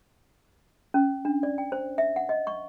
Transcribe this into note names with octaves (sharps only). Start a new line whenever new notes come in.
C#4
D4
D5
G5
C5
E5
F#5
D#5
C#6